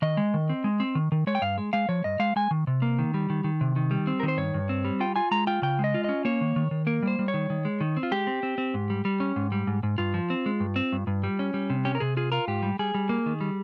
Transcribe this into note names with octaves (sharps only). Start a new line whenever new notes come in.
D#3 D#5
G#3
D#3
C4
G#3
C4
D#3
D#3
G#3 C#5
G5
G2 F5
G#3
G#3 F5
F3 C#5
G2 D#5
G#3 F5
G#3 G#5
D#3
C3
A#3
D#3
G3
D#3
D#3
C3
D#3
G3
C4
A#4
D#3
C5
G2 C#5
G2
C4
G3
F4 G5
F4 G#5
G#3 A#5
F4 G5
C#3 G5
G#3
D#5
F4
C#4 D#5
A#3 C#5
D#3
D#3
D#3
A#3 A#4
G3 C5
G3
C#5
D#3
D#3
G#3
D#3
C4
F4
G#3 G4
C4
C4
C4
G#2
G3
G3
C#4
G#2
G3
G#2
G#2
G2 F4
F3
C4
G#3
G2
C4
G2
G2
G3
C#4
G3
C3
C#4 G4
A#4
C3 G#4
F4 G#4
F4 A#4
G#2 G4
G3
G3 G#4
G3
A#3
D#3
G3